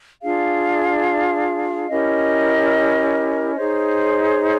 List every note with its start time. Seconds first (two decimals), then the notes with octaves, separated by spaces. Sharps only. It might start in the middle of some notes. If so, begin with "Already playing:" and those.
0.22 D4 F4 G#4 F5
1.89 C#4 E4 G4 A#4 D#5
3.55 D#4 G#4 C5 C#5